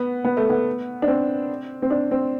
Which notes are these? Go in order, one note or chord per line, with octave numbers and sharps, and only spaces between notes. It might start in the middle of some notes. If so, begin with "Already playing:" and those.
Already playing: B3
B3
A3
B3
D4
C4
C4
D4
C4